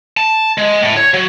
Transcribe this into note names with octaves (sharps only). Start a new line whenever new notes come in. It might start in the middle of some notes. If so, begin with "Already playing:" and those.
A5
G#3
A2
C#5
F#3